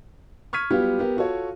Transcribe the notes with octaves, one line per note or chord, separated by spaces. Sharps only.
C#6 F6 G#6 B6 D#7
F#3 G3 B3 F4 G4
B3 G4 A#4
F4 F#4 A4 C#5